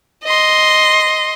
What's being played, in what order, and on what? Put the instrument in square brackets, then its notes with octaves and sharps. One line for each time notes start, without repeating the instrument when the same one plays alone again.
[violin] D#5 C6